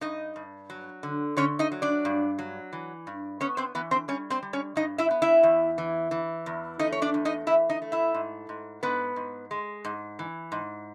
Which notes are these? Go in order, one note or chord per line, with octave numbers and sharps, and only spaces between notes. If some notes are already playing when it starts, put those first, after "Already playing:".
G2 D#4 D#5
G2
F#3
D3
D3 C#4 C#5
D#4 D#5
F#3
D4 D5
G2
F#3
E3
G2
B3 C#4 C#5
C4 C5
E3 B3 B4
C4 C5
G3 C#4 C#5
C4 C5
G3
C#4 C#5
G2 D#4 D#5
E4 E5
B3
E4 E5
E2
E3
E3
E2
A3 D#4 D#5
C#5
D4 D5
E2
D#4 D#5
E3 E4 E5
D#4 D#5
A3
E4 E5
G#2
G#2
G#2 B3 B4
G#2
G#3
G#2
E3
G#2